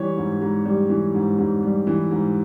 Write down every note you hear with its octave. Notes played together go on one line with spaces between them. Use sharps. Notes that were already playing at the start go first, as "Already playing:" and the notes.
Already playing: E3 G3 C#5
G#2
G#2
G3
E3
G#2
G#2
G3
E3
G#2